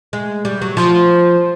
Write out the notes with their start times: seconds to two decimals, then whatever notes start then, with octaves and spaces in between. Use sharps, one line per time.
0.13 G#3
0.45 G3
0.62 F#3
0.77 F3